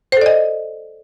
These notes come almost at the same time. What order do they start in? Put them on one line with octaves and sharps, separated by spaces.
C5 A4 D5 D#5